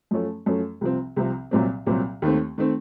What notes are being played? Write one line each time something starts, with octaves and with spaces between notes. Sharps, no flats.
F#2 F3 A3 C#4 A4
F#2 F3 A3 C#4 A4
C2 C3 F3 C4
C2 C3 F3 C4
C2 A#2 F#3 C4
C2 A#2 F#3 C4
D#2 D#3 A3 C4
D#3 A3 C4